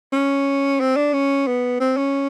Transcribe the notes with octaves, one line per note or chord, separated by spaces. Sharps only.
C#4
C4
D4
C#4
B3
C4
C#4